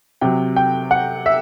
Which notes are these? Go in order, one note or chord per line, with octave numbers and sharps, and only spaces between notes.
C3 F#3 G5
G5
F#5
E5